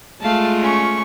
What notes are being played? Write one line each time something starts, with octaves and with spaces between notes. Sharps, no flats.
G#3 A3 F4 F5 A5
C#4 C#6